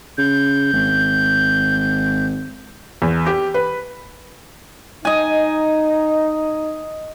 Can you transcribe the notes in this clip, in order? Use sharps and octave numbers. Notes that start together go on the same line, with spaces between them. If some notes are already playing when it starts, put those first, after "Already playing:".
C#3 G6
G#1
E2
G4
B4
D#4 D#5 G#5